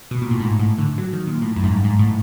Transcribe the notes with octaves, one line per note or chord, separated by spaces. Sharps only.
B2
A#2
A2
G#2
A2
D3
F#3
D#3
A#2
A2
F#2
G#2
G2
G#2
A2